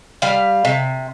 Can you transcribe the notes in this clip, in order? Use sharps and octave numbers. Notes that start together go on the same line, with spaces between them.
G3 F5
C3